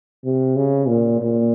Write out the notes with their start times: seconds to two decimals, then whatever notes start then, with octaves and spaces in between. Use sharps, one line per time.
0.25 C3
0.56 C#3
0.88 A#2
1.20 A#2